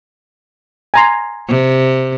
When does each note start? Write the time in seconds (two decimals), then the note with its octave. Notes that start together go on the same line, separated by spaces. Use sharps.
0.94 G#5 A#5 C6
1.48 C3